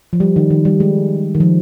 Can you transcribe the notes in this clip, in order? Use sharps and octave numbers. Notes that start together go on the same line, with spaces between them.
F3
G3
D#3
D#3
G3
G#3
D#3
F3